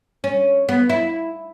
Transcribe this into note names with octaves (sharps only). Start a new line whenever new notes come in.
C#4
B3
E4